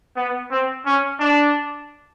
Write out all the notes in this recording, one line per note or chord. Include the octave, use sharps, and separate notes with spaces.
B3
C4
C#4
D4